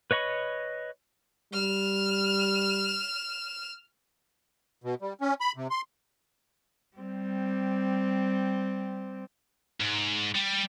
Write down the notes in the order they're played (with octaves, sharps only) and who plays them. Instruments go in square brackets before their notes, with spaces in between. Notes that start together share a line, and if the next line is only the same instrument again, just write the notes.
[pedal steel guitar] B4 C#5 D#5 B5 C#6
[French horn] G3 [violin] F6 E7
[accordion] B2
G3
C#4
B5
C3
C6
[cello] G3 C4
[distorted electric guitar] G#2
G3